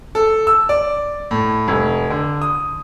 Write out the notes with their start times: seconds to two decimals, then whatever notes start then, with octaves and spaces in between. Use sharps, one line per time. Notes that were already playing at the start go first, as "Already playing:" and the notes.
0.15 A4
0.47 E6
0.69 D5
1.31 A2
1.68 F1
2.10 D3
2.42 D#6